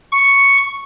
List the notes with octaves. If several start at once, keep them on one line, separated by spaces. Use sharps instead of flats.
C#6